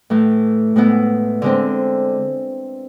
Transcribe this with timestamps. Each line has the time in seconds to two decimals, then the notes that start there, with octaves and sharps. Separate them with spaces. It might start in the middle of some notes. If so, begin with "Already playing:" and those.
0.10 A2 E3 A3
0.76 A2 G#3 B3 E4
1.42 D3 G#3 C4